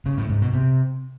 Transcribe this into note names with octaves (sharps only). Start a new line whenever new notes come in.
C#3
A2
G#2
B2
C3